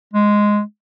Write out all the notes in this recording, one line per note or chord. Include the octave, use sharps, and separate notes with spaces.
G#3